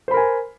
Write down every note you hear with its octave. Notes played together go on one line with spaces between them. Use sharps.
A#4 C5 G#5 B5